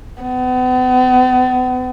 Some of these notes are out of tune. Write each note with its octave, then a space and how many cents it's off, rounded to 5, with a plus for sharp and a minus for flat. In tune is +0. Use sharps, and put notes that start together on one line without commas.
B3 +40